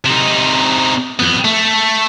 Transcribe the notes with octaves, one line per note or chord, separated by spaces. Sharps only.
C3 D#4
F2 B3
A3